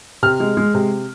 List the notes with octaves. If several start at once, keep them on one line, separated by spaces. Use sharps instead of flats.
C3 F6
G#3
G#3
C3